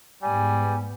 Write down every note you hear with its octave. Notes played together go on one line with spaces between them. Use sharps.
G#2 G3 B3 G#5